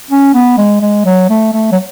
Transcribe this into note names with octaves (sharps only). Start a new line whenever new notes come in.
C#4
B3
G#3
G#3
F#3
A3
A3
F#3